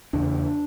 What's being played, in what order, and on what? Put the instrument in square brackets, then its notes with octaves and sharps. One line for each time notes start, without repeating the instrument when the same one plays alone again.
[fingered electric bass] E2 C#3 D4